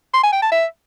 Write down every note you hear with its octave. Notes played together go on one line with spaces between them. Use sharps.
C6
G#5
G5
A5
E5